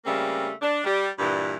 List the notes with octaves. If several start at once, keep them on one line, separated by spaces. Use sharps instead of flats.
C#3 G3 A3 A#3 C4
D4
G3
G2 A#2 E3 G3